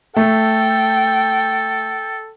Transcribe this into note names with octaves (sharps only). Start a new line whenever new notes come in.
A3 A4 G5